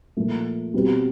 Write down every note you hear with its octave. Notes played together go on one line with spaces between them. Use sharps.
A#2 F3 A3
B2 G3 C4